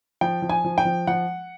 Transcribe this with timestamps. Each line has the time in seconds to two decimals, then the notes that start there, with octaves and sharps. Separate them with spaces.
0.21 F3 G5
0.42 F3
0.49 G#5
0.65 F3
0.78 G5
0.85 F3
1.07 F3 F#5